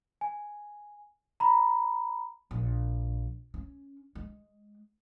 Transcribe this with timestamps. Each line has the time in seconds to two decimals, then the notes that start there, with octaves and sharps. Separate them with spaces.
0.21 G#5
1.40 A#5 B5
2.51 A#1
3.54 C#4
4.15 G#3